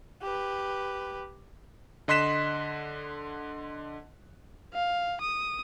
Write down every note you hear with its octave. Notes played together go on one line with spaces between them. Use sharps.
G4 B4
D3 D#5 C6 F#6 B6 E7
F5
D#6